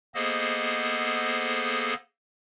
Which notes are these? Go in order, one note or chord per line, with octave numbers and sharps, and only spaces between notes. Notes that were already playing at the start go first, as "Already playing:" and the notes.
A#3 B3 G#4 A4 C5 D#5